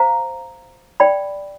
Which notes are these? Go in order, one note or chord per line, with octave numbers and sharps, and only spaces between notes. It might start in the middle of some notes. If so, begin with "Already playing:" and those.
Already playing: C5 F5 A#5
D5 G5 B5